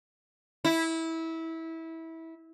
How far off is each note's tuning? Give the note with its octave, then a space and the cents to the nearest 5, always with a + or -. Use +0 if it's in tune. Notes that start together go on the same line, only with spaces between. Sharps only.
E4 -20